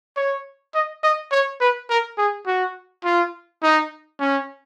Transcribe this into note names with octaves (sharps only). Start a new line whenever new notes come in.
C#5
D#5
D#5
C#5
B4
A#4
G#4
F#4
F4
D#4
C#4